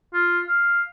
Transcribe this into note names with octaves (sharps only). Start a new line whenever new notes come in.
F4
F5